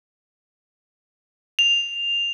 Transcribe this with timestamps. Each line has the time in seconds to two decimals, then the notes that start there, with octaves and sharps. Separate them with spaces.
1.59 F7